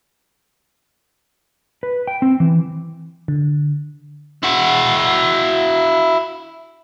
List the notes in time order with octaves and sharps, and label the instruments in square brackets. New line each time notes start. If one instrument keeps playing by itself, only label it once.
[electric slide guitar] B4
G5
C4
E3
[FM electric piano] D3
[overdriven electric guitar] E4 F#4